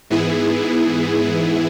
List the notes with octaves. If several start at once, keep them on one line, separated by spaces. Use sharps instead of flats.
G#2 E3 B3 E4 G#4